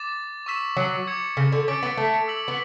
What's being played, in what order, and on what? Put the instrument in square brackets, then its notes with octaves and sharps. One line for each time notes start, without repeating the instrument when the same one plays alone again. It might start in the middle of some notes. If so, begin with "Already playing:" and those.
Already playing: [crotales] D6 A6 E7
C#6 E6 B6 E7
[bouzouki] F#3
[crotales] D6 G#6 C#7
[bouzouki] C#3
D3
[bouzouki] C#4 [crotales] D6 A6 D7
[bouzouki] B3
A3
[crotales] E6 B6 F#7
[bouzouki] B3